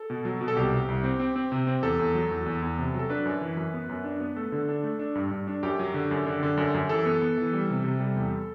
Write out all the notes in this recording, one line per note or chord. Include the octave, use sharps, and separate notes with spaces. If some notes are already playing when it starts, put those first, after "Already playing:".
Already playing: A4
B2
F#3
B2
A4
C2 G4
C3
C2
C4
C4
C4
C3
C4
E2 A4
E2
F#3
E2
E2
E2
C3
F#3
A4
D4 B4
F#2
E3
F#2
B3
F#2
D4
B3
A3 A4
D3
D4
A3
D4
G2
G2
D4
F#2 G4
F#3
D3
F#2
D3
D3
F#2
F#2
E3 A4
B3
B3
E3
G3
C3
C3
G3
E2